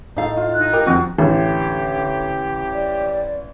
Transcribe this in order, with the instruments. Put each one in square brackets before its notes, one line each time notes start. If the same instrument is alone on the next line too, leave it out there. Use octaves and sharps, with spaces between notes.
[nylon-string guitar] A2 F5 [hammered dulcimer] D#4 A4
[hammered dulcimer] F4
[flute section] D#4 F#6
[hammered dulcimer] G4 [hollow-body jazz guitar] A#4
[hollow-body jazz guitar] F2 F3 C4 [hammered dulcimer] F#4 A5
[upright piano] A1 [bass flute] D3 [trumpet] G4
[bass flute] D5